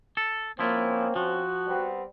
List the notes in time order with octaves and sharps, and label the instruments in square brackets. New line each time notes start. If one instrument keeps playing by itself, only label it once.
[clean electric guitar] A4
[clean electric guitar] F3 E4 F4 [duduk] A#3 [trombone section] C4 C#4
[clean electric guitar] F3 [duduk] F#4
[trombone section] G3 B3 C4